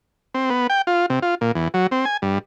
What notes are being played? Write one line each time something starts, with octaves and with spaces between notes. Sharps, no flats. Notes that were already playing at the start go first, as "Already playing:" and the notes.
C4
B3
G5
F4
C3
F4
A#2
E2
F#3
C4
G#5
G2